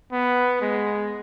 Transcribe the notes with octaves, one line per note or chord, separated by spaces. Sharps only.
B3
G#3